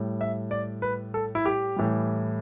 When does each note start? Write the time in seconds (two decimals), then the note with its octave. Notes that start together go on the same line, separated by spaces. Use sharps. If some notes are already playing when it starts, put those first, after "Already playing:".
Already playing: A2 G3
0.21 E5
0.51 D5
0.82 B4
1.14 A4
1.35 E4
1.45 G4
1.76 A2 E3 G3